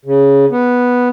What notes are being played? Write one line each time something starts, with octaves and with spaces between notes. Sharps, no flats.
C#3
B3